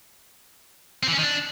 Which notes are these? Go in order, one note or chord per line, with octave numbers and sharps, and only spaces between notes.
C4
E3
C#4
D#3
D4